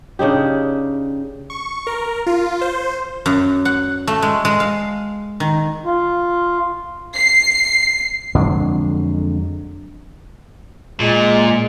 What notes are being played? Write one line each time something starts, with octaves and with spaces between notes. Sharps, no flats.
C#3 D4 D#4 G4
C#6
A#4
F4
C5
F#2
F#5
A3
G#3
G#3
F5
D#3
F4
C7
F2 D3 F#3 G#3
A#2 G#3